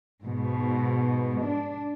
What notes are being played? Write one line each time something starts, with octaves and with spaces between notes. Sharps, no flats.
G#2 B2
D4